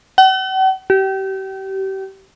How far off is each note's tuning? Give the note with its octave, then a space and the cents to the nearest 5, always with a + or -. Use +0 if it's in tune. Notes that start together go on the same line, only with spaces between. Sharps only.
F#5 +45
G4 -30